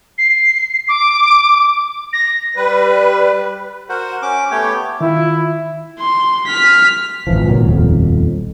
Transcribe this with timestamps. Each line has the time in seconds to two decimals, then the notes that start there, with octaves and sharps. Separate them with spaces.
0.18 C7
0.88 D6
2.13 A#6
2.56 G3 B4
3.89 F#4 A#4 C5 F#5
4.22 C#4 D6
4.51 A3 B3 G4 C#5 G5
5.01 D#3 E4 F4
5.99 C6
6.47 F6 B6
7.27 G#1 C#2 E3 F3
7.47 C#2 A#2 D#3 F#3
7.64 D#1 B1 F2